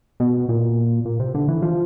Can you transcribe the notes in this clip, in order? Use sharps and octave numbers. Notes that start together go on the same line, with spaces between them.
B2
A#2
A#2
C3
D3
E3
F3